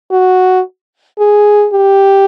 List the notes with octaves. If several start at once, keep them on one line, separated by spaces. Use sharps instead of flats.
F#4
G#4
G4